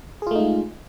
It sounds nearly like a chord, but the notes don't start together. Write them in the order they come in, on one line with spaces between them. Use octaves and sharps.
G#4 F4 A3 D#4 G#3